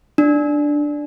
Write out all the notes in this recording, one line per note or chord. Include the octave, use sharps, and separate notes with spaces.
D4